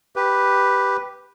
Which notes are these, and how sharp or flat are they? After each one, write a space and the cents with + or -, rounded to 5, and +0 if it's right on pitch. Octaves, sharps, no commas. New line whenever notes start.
G4 +0 B4 +0